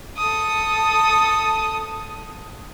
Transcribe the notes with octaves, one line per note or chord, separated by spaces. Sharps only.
A4 D#6